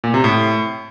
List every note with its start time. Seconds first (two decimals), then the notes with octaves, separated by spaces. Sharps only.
0.04 A#2
0.14 C3
0.24 A2